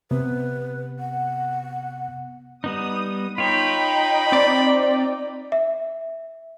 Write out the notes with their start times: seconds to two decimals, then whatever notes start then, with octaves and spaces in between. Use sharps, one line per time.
0.11 C3 B3 B4
0.99 F#5
2.64 G3 B3 D#4 D#6
3.38 D#4 F4 C#5 G5 B5
4.32 C4 D5
5.52 E5